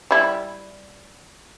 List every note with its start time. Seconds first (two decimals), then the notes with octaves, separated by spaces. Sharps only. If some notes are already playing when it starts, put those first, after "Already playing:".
0.11 G3 E4